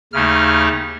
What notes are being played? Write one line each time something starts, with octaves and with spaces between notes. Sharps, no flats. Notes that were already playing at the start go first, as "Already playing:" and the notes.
D#2 C#3 A3 D#4 F6